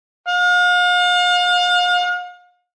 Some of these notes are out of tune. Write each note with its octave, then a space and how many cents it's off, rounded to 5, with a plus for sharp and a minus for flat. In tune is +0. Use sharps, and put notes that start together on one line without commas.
F5 +40